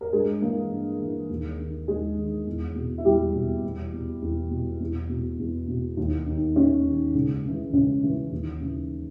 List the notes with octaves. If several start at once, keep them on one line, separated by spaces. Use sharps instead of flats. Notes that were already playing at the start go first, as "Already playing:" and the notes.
A#4
G2 G#3 G#4
E3 A#3 A#4
G2
E3
D#2
D#3
D#2 G#3 G#4
D#3
E2
B2
E4
E2 G3 G4
B2
E2
B2
E2
B2
E2
B2
E2
B2
D#2
D#3
D#2 C#4
D#3
C#2
C#3 E3
C#2 C#4
C#3 E3
D#2
C#3 E3